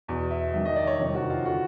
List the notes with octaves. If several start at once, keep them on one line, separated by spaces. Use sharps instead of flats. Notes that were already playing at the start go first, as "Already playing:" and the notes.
E2 B2
E5
G2 D#3 E5
D#5
D5
C#5
F2 C3 D#3
F#4
F4
D3 F#4